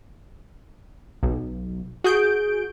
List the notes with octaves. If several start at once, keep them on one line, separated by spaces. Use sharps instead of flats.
B1
F#4 G#4 G6 D7